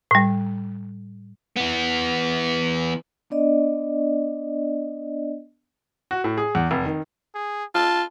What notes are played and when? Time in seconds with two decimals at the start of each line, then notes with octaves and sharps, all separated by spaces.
0.11 A2 G3
1.56 E3 B3
3.30 B3 D4 D5 D#5
6.11 F#4
6.24 A2
6.37 G#4
6.55 E2
6.71 F1
6.85 D#3
7.34 G#4
7.75 F4 A5